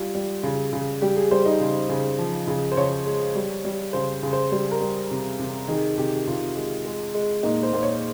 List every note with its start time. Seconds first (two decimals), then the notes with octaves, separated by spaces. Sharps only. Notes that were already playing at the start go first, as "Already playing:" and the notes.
Already playing: G3 F4
0.15 G3
0.43 C#3
0.73 C#3
1.02 G3 G4
1.17 G#4
1.31 G3 C5
1.46 D#4
1.60 C#3
1.89 C#3
2.19 F3
2.48 C#3
2.72 C5
2.77 C#3 C#5
3.06 G#3
3.35 G3
3.65 G3
3.93 C#3 C5
4.23 C#3
4.33 C5
4.52 G3 C5
4.71 A#4
4.81 G3
5.11 C3
5.40 C3
5.68 D#3 G#4
5.98 C3 G4
6.16 G4
6.27 C3 F4
6.56 G#3
6.85 G#3
7.14 G#3
7.43 A#2 D#4
7.63 C5
7.73 A#2 C5
7.83 C#5